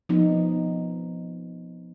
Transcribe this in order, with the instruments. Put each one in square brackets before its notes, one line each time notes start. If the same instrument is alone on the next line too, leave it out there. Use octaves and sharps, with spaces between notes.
[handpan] F3 B3 D#4